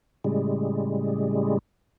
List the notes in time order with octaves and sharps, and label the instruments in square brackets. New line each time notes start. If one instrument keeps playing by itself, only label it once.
[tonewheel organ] A2 C#3 G3 G#3